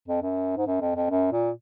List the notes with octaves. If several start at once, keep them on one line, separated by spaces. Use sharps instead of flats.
F2
F#2
G#2
F#2
F2
F2
F#2
A#2